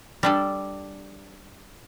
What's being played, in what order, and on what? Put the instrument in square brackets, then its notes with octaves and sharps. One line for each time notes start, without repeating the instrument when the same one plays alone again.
[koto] G3 D4 A4